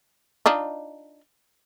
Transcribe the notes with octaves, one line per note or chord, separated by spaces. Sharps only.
D4 D#4 F4